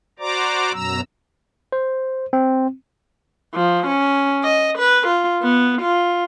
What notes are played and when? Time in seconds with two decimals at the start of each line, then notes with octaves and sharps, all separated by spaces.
0.19 F#4 C5 D5 A#5 D6
0.73 F#2 B2 F#3 A#5 E6
1.72 C5
2.33 C4
3.54 F3
3.87 C#4
4.43 D#5
4.78 B4
5.07 F4
5.43 B3
5.82 F4